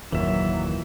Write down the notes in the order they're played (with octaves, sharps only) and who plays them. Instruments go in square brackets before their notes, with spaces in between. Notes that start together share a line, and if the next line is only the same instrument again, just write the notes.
[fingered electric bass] F#1 D#2 A#2 [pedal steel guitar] E3 E5 [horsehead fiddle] F#3